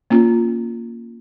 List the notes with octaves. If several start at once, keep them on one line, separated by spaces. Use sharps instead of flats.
A#3 C#4 F4